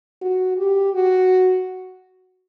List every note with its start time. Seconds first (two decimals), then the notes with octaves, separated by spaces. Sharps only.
0.22 F#4
0.58 G4
0.94 F#4